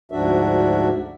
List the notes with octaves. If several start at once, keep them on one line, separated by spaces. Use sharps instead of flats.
D2 G#2 F3 D4 F#4 E5